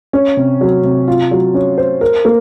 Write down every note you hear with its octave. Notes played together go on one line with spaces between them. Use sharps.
C#4
C3
F#3
C3
F4
F#3
C#4
C5
A#4
A#3